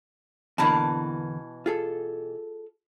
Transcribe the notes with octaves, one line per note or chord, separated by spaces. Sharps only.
E2 B2 D3 E3 A#3 A5
F4 G#4 A4